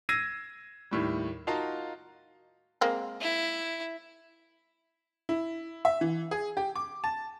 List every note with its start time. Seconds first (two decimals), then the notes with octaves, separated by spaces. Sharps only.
0.09 E6 G#6 A#6 C7 D#7
0.91 D#2 A2 G3
1.47 D#4 F4 F#4 A#4 F5 A5
2.81 G#3 A#3 C4
3.21 E4
5.29 E4
5.85 E5
6.01 E3
6.31 G#4
6.57 G4
6.76 D6
7.04 A5